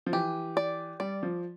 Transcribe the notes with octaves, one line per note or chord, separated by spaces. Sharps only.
F3
E3 G4
D5
G3 D5
F3